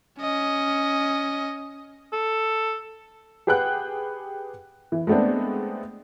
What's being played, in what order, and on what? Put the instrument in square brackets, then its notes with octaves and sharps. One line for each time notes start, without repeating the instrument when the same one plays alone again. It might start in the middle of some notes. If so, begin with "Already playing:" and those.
[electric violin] C#4 D#5
[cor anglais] A4
[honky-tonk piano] G4 G#4 B4 F#5 G5 F#6
E3
G#3 A3 B3 C4 D4